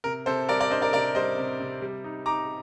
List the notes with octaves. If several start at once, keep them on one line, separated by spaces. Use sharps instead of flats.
C3 A#4
C3 A4 C5
G3 A#4 D5
A#4 D5
D4 C5 D#5
A#4 D5
C3 A#4 D5
G3 C5 D#5
C3
C3
G3
D#4
D#4 A#5 D6